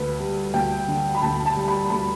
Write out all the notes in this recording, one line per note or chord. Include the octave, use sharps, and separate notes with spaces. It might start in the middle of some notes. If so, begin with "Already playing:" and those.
Already playing: D2 B4
G3
D2 G5
D3
B5
D2 A5
A5
G3
B5
D2 B5